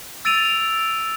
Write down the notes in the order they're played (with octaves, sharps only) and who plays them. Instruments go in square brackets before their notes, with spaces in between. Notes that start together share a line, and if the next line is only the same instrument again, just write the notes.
[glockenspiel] E6 A6 D7 D#7 F7